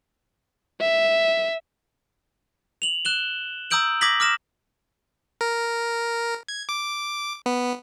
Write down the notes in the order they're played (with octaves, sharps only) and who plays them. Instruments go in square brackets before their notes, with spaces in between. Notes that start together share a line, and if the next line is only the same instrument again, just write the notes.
[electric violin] E5
[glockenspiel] F7 F#7
F#6 E7 G7
A#5 D#6 E6 G6 D7 F#7
D6 D#6 G#6 A#6 B6 F#7
D6 F6 A#6 E7
[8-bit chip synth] A#4
G#6
D6
B3